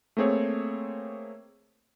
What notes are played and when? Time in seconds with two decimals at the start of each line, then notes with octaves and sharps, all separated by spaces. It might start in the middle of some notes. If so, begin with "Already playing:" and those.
0.17 A3 A#3 C4 G#4 C#5